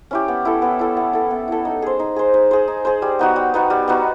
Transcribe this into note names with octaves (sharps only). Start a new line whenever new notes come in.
C#4 E4 G4
B3
E4 A4
B3
E4 A4
B3
E4 A4
B3
E4 A4
D#4
G#4 C5
D#4
G#4 C5
D#4
G#4 C5
D#4
G#4 C5
G3
B3 D#4 F#4
G3
B3 D#4 F#4
G3
B3 D#4 F#4